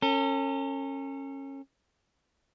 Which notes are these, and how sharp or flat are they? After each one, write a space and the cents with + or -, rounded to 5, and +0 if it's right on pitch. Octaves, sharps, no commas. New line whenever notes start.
C#4 -20 A4 +45